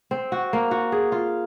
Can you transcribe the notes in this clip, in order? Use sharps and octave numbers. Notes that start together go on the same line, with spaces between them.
C4
F#4
A#3
F#4
G#4
F4